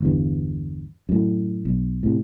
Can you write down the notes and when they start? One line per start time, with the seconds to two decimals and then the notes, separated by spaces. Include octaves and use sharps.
0.01 G1 E2 G2
1.09 F#2 A2
1.65 B1
2.03 A2 C3